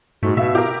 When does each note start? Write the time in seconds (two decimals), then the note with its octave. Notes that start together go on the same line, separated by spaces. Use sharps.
0.23 G#2 A3 F#4
0.37 B2 E5 F5
0.55 G4 A#4